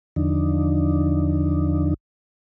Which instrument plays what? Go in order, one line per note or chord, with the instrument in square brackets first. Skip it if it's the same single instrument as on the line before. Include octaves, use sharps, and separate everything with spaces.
[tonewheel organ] E2 D3 F3 D4 D#4